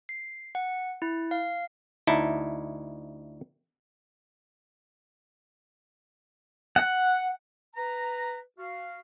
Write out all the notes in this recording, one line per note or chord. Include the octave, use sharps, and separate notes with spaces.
C7
F#5
E4
F5
D2 D#4 E4 A5
F#5
B4 A#5
F#4 F5